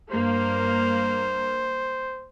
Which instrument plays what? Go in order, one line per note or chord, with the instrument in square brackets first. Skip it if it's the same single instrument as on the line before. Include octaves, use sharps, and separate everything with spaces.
[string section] G2 A#3 [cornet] C5